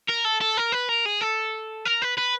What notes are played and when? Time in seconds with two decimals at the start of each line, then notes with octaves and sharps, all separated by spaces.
0.09 A#4
0.24 A4
0.41 A4
0.57 A#4
0.72 B4
0.89 A#4
1.05 G#4
1.21 A4
1.85 A#4
2.02 B4
2.17 B4